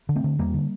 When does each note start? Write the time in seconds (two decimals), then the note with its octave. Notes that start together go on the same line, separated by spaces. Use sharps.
0.09 D3
0.16 A3 C4
0.24 D3
0.39 E2 G3 A#3
0.54 D3